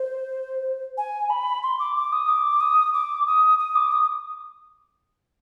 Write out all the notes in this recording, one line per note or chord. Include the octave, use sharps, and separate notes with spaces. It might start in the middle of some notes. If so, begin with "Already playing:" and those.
Already playing: C5
G#5
B5
C6
D6
D6
D#6
D6
D#6
D6
D#6
D#6
D6
D#6